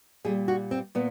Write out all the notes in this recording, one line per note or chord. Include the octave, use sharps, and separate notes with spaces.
A#2 G3 G#4
F#4
C4
A#2 B3